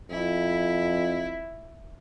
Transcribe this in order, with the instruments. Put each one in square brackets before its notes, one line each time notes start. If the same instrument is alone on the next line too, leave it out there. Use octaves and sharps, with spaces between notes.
[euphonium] F2 [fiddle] E4